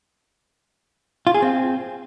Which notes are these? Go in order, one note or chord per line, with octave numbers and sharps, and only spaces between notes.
F4
G#4
C4